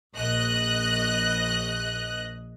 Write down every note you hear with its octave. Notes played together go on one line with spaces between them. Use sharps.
A#1 D#5 F#6